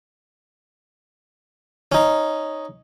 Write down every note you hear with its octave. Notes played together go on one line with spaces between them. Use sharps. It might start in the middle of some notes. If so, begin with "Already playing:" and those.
C#4 D#4